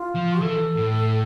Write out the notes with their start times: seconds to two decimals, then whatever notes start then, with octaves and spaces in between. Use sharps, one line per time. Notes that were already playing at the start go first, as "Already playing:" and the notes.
Already playing: F4
0.15 F3
0.41 E3 A4
0.76 A2